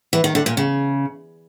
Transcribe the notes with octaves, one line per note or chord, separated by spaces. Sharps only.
E3
D#3
D3
A#2
C#3